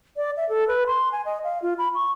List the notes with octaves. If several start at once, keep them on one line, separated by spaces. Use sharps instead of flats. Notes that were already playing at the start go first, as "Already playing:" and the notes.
D5
E5
A4
B4
C6
G#5
D#5
F5
F4
B5
C#6